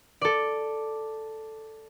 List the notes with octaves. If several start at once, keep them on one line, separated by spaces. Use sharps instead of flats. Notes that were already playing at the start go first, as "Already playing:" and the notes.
A4 D5